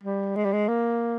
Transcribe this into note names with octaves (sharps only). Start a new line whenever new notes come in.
G3
G#3
G3
G#3
A#3